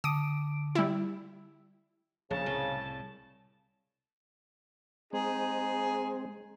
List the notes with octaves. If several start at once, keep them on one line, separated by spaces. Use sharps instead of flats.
D3 D#6 D7
G3 E4
A#1 C#3 A5
C2 A2
G#3 C4 D#4 G#4